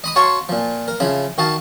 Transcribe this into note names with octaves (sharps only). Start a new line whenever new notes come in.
D#5 B5 D#6
F#4 C#5 F5 A5 C6 C#6
A#2 F3
A#4
C#3 F3 E4 B5
D#3 F#4 D#5 F5 A5